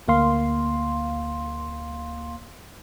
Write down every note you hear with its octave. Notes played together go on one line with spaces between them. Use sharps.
D2 A#3 F5 C6